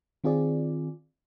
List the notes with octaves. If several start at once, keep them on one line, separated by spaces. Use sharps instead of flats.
D#3 C4 F4 G#4 D5